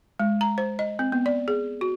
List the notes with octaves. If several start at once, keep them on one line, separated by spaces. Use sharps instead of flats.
G#3
A#5
C5
D#5
C4
B3
D5
G#4
F#4